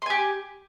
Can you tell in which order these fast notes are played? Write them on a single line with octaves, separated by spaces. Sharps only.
C6 G#5 G4